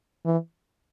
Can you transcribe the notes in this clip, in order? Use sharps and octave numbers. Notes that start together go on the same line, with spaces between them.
E3